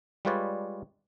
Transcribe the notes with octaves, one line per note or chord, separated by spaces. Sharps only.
G3 G#3 F4 B4 C#5 D5